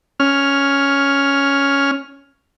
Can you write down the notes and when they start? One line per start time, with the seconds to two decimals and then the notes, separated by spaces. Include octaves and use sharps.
0.20 C#4 F6